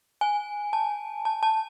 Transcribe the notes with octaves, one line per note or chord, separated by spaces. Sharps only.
G#5
A5
A5
A5